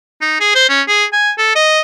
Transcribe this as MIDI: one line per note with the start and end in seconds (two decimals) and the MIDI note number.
0.21 0.39 63
0.40 0.51 68
0.55 0.66 72
0.69 0.82 61
0.88 1.05 68
1.13 1.32 80
1.38 1.54 69
1.56 1.81 75